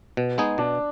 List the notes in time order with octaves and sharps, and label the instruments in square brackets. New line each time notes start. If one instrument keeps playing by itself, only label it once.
[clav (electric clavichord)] B2
G#3 B3 D#4 G#4
[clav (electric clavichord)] B2 [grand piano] D4